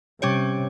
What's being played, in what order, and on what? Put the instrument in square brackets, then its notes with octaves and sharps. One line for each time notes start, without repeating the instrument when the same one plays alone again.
[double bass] C3 [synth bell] G3 C#4 G4 C#5